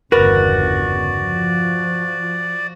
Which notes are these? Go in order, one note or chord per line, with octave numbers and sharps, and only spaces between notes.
G1 E2 C#3 F#4 A#4 B4 D5
F3